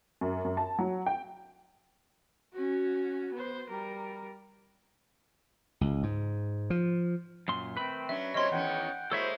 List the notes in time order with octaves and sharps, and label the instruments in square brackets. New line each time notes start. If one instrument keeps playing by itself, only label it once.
[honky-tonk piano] F#2
F#2
A5
F#3
G5
[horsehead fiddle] C#4 F#4
B3 C5
G3 A#4
[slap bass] C#2
G#2
F3
[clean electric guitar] F#2 A#2 C6
[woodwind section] D#3 A3 C4 [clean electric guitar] B4 B5
[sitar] F#3 C#4 D4 [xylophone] E5
[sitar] A#2 F#3 C4 [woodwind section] C#4 G4 C#5 [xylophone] D#5 C6
[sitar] E2 D#3 C#4 [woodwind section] F#5 G5
[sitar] G#3 A#3 [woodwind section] E4 F#4 C5 [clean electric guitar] A4 C#5 E5